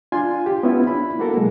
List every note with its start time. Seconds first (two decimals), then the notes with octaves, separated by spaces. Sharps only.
0.12 D4 F4 G#5 C6
0.46 G4
0.63 B3 C#4 E4 F4 B4
0.87 D4 E4 B5
1.19 A#3 F#4 A4 A#4
1.37 B2 F#3 G#3